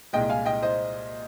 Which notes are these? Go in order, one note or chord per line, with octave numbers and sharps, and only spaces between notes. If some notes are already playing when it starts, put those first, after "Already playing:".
C2 A#2 G#3 D#5 G5
F5 G#5
D#5 G5
C5 D#5